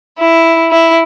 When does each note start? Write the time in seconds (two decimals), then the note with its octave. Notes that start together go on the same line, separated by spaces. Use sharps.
0.18 E4
0.70 E4